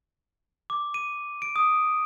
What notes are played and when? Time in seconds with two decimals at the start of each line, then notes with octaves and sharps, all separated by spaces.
0.70 D6
0.94 D#7
1.42 D7
1.56 D#6